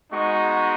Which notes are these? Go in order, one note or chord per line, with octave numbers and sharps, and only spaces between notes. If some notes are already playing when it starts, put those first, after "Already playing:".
G#3 B3 D#4 F#4 C#6